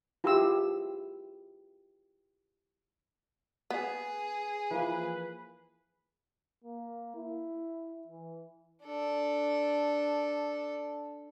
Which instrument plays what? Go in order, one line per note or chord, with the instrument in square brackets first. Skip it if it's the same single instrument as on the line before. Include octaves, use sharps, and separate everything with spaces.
[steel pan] E4 F4 G4 G#4 C6 E6
[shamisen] B3 [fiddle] G#4
[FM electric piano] E3 F3 A#3 [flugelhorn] B4
[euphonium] A#3
E4
E3
[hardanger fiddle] D4 A4